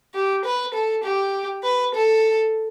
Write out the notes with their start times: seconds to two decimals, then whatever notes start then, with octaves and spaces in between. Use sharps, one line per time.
0.14 G4
0.45 B4
0.74 A4
1.04 G4
1.63 B4
1.94 A4